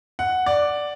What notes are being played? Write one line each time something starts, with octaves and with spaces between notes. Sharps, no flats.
F#5
D5